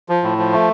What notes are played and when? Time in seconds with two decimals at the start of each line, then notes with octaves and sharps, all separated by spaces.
0.09 F3
0.23 A2
0.38 F3
0.52 A3